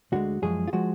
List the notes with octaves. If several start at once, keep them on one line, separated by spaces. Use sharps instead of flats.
D2 D3 G#3 F#4
F#2 F3 G#3 G#4
F4
F3 G#3 F#4